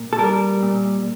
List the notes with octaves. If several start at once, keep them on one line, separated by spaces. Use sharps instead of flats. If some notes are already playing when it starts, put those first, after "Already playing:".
Already playing: A#2
A4
G3 A#4
A#2